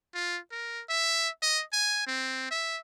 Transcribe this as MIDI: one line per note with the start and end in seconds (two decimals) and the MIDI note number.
0.14 0.39 65
0.51 0.82 70
0.89 1.29 76
1.42 1.63 75
1.73 2.06 80
2.07 2.50 60
2.51 2.78 76